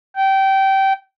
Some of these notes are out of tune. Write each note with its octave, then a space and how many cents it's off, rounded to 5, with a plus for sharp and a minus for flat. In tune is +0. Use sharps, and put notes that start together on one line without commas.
G5 -20